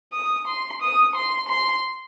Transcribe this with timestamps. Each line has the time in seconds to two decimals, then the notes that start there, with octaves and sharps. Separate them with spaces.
0.13 D#6
0.47 C6
0.82 D#6
1.15 C6
1.48 C6